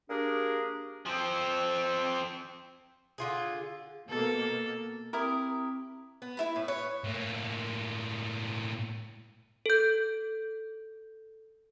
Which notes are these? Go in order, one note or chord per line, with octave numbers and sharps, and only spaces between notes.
A#3 D4 G4 G#4
F3 C4
D3 F4 G#4
B2 A#3 A4
C4 E4 G4 A#4 D#6
B3
E4 E5 B5
A2
B4 C#5
A2 A#3
A4 G6